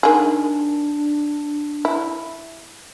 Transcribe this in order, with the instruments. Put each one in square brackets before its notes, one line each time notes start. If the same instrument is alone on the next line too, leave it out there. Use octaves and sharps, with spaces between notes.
[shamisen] D#3 G#4 [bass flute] D4
[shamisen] E4